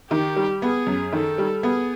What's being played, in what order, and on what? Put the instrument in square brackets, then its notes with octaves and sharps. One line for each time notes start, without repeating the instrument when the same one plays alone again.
[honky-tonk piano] D#3 [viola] G4
[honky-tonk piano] G3
[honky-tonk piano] B3 [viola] G#4
[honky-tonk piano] F#2
[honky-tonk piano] D#3 [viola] A4
[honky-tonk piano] G3
[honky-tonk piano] B3 [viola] G#4